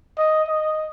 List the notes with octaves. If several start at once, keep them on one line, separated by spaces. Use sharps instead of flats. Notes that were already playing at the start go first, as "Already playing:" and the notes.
D#5
D#5